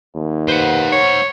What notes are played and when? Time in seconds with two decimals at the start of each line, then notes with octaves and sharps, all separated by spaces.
0.15 D#2
0.48 B4 C5 F#5
0.92 C#5